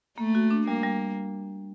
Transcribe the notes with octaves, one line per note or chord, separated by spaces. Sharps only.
A3 A#3
F#4
D4
G3 A#3
G3